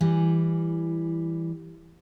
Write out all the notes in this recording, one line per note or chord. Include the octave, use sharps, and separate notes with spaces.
E3 G3